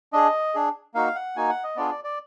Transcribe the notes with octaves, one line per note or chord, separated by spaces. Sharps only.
D4 G#4 D#5
D4 G#4
A#3 D#4 F#4 F5
F#5
A#3 D#4 F#4 G#5
F#5
D#5
B3 D4 F4 G#4 D5
D5
D5